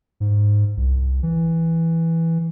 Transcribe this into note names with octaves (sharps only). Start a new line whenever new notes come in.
G#2
C2
E3